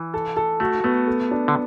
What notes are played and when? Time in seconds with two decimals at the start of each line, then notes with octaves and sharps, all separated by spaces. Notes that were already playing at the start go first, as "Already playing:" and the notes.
Already playing: E3
0.14 A4
0.37 A4
0.60 A3 F#4
0.84 A3 B3
1.07 A4
1.31 D4
1.48 D3